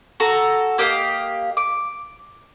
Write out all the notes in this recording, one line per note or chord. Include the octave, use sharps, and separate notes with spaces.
F#4 A4 A#5
A#3 G4 D#5 F5
D6